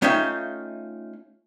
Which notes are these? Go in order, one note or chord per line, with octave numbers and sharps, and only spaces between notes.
A3 C#4 D#4 F4 E5 G5